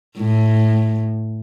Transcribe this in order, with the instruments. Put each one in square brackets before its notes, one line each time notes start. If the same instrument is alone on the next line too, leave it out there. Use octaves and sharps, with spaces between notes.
[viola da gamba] A2